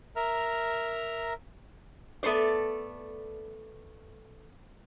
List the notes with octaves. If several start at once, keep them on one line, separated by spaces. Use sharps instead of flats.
A#4 E5 A#5 F6
A3 B3 A4 C5 D5